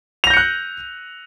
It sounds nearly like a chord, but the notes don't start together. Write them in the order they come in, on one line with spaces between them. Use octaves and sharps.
F7 A#6 G6 C#7 F#6